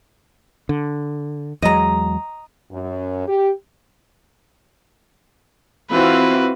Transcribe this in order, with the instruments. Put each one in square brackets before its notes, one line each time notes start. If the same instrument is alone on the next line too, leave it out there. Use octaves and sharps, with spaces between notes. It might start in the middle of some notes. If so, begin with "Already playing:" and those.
[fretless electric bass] D3
[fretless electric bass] E2 F#3 G#3 [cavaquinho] D#5 A#5
[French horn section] F#2
G4
[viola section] E3 C4 F4 [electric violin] F#4 B4